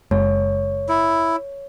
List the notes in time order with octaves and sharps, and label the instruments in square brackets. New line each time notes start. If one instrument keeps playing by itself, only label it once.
[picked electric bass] F#1 G#3 [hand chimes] C#5
[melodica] E4